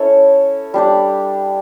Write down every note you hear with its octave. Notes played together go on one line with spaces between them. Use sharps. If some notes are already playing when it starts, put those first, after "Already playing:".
Already playing: C#4 E4 A4 C#5
G3 D4 G4 D5